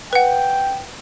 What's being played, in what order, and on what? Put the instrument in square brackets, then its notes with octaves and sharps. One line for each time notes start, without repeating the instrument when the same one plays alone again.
[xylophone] B4 F#5 [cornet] G5